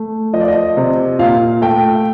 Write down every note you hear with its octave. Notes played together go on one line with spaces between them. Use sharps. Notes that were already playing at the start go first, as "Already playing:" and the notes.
Already playing: A3
F3 D#5
D5
D#5
C3
A#2 F5
A3 G5